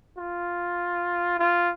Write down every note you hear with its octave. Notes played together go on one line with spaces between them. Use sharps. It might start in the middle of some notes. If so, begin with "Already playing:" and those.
F4
F4